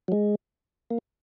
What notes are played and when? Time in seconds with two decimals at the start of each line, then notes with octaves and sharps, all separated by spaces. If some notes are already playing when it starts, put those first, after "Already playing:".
0.08 F#3
0.12 G#3
0.90 A#3